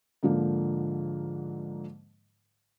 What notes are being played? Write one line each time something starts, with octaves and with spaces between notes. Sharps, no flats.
G#2 D3 F3 A#3